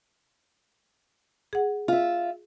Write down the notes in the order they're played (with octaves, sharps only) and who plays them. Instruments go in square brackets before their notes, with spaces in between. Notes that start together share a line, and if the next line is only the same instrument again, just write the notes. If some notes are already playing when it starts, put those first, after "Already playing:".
[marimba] G#4 F#5
[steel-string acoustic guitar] F4 E5